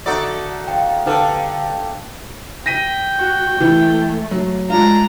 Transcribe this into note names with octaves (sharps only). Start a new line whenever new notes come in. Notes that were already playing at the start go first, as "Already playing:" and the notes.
D3 D#4 F#4 A4 D5 E5
F5 G5
D3 D#4 G4 A4 B4 B5
G5 A#6 B6 D#7
F#4
E3 A3
F#3
G#3 D4 F4 A#5